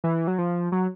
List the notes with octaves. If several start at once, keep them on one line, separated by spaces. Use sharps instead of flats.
E3
F#3
F3
F#3